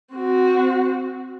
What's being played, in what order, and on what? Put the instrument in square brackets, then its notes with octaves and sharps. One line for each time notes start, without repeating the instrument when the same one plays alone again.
[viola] C4 F#4